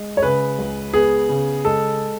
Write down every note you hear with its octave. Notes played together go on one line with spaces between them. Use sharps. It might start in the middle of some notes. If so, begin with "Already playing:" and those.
Already playing: G#3
C#5
C#3 B4
C#2
B3 G#4
C#3
G#3 A4